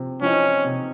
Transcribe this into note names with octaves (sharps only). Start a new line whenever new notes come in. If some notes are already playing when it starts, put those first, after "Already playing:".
Already playing: C3 F3 C4
F3 C4 C#4 D#4
C3